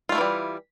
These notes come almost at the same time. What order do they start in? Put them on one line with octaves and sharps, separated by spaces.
F4 A3 E4 E3 G3